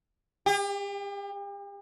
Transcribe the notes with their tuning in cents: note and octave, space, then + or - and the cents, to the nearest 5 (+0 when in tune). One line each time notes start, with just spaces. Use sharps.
G4 +40